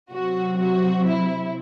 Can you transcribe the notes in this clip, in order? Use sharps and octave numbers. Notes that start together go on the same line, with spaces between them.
C3 F#3 C4 F#4
F#4
E4